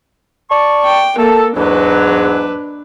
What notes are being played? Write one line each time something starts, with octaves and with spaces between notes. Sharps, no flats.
D5 A5 C#6
G5
A#3 A4
E2 G#2 F#3 D4 B4